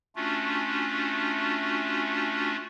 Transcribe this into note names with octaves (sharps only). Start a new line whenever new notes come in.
A3 C#4 D4 F4 F#4